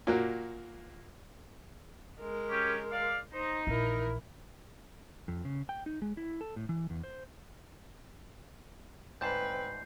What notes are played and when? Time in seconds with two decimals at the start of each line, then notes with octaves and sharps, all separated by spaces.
0.07 A#2 A#3 F#4
2.20 G#3 A#4
2.50 C#4 G4
2.91 D5 F5
3.33 D#4 C5
3.67 A#1 E3 E4 A#4
5.28 F2
5.45 C#3
5.69 G5
5.86 D#4
6.02 G#3
6.17 E4
6.41 A4
6.56 A2
6.69 E3
6.90 E2
7.04 C5
9.21 D2 G#2 C4 B4 A5 G6 C7